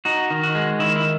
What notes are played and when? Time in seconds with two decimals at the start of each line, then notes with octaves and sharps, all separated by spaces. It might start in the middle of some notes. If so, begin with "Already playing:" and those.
0.05 D#4 F#4
0.30 D#3
0.43 F#4
0.55 G#3
0.79 D#3 E4
0.96 E4